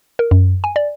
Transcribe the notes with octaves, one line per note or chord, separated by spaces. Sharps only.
A#4
F#2
G#5
D5